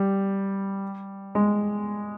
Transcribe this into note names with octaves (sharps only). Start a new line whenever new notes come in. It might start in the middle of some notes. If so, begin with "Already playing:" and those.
Already playing: G3
G#3